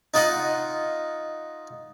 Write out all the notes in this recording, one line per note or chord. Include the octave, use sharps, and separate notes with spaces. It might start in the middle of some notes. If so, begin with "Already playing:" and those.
D#4 F4 D#5 F#5